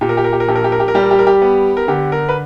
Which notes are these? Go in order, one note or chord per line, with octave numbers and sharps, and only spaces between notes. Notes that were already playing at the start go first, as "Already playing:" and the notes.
A#2 G4
A#4
G4
A#4
G4
A#4
A#1 G4
A#4
G4
A#4
G4
A#4
G3 G4
A#4
G4
A#4
G4
B3
A#4
D3 G4
A#4
B4